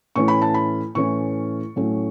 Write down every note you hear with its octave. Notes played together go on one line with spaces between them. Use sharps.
A2 E3 A3 C#4 C#6
B5
A5
B5
A2 E3 A3 C#4 C#6
A2 F#3 A3 C#4